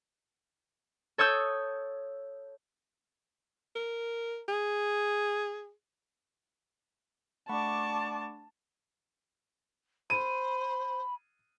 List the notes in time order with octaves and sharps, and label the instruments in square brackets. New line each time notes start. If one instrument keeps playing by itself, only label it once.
[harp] A4 C#5 D#6 E6 G6
[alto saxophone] A#4
G#4
[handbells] A3 F#5 B5 [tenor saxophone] D4 [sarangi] A5 [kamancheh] C#6 D6
[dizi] C5 [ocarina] B5 [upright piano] D#7